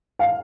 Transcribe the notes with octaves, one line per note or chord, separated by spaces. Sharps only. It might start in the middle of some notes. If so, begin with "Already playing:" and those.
F5